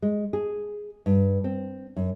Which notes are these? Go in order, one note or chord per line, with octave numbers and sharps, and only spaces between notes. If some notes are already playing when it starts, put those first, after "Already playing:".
G#3
G#4
G2
C4
F#2